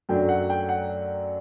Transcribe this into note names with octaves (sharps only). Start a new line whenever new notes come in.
F#2 F#3 A3 D4 G5
F#5
G5
F#5